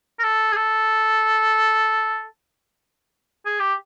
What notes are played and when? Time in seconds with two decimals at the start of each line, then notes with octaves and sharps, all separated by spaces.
0.19 A#4
0.24 A4
0.52 G#4
0.56 A4
3.46 G#4
3.60 G4